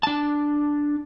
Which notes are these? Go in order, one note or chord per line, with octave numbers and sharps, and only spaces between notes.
D4 A5